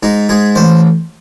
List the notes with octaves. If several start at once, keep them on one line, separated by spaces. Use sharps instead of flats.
G#2 D#4
G#2 G#4
A1 C5